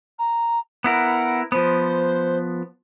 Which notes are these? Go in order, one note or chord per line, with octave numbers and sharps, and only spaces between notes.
A#5
B3 E4 A#4 F#5
F3 B3 C5